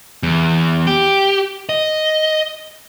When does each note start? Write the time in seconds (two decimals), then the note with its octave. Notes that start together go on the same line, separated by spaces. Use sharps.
0.23 E2
0.87 G4
1.69 D#5